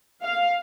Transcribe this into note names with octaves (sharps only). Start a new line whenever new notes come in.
F5